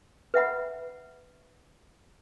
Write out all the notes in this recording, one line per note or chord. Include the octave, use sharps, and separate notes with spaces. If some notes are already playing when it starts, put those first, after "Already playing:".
B4 E5 F#5 B5